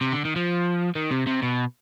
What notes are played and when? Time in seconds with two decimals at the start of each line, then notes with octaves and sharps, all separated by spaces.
0.01 C3
0.12 D3
0.25 D#3
0.36 F3
0.95 D#3
1.11 C3
1.27 C3
1.43 B2